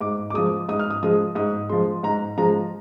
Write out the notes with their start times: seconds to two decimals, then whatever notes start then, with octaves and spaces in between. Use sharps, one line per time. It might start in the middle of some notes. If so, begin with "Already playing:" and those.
0.01 G#2 D6
0.30 D6
0.34 F3 G#3 D#6
0.69 G#2 D#6
0.79 F6
0.90 D#6
1.03 F3 G#3 D#6
1.35 G#2 D#6
1.69 F3 G#3 C6
2.03 G#2 A#5
2.37 F3 G#3 A#5